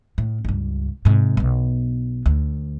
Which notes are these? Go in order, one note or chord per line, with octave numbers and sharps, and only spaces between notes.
A2
C#2 G2
G#2 C3
B1 B3
D2